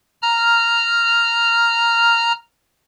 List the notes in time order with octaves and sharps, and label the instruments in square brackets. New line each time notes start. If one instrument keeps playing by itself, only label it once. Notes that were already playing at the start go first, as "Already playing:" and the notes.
[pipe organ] A#5 F6